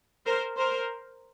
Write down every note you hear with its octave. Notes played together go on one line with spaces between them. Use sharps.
A#4 C5
A#4 C5